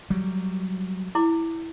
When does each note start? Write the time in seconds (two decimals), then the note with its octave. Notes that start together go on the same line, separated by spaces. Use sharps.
0.10 F#3 G3
1.15 E4 D6